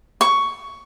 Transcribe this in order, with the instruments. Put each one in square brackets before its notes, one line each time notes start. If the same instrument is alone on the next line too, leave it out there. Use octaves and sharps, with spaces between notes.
[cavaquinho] C#6